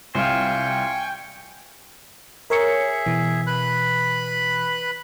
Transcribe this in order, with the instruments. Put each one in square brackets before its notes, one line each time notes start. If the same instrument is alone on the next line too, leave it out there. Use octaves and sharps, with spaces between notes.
[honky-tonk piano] C2 [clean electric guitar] F4 C5 [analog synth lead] G5 [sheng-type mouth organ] G#5 C#6
[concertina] G#4 E5 [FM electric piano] A#4 C#5 C#7
[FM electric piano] B2 E3
[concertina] B4 B5 F#6